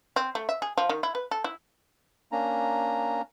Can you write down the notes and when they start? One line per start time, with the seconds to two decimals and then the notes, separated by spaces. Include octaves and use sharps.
0.16 C4
0.35 A3
0.49 E5
0.62 G#4
0.78 F3
0.89 D#3
1.03 E4
1.15 B4
1.31 A4
1.44 E4
2.32 A#3 C#4 D4 A#5